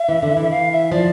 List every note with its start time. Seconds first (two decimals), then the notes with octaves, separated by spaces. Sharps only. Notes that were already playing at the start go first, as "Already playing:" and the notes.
Already playing: E5
0.09 E3
0.22 D3
0.37 E3
0.50 F5
0.71 E5
0.92 F3 D5